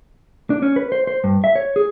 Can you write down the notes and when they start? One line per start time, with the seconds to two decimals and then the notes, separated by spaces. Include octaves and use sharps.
0.50 D4
0.62 C#4
0.76 B4
0.92 C5
1.07 C5
1.24 G2
1.44 E5
1.56 C#5
1.76 G#4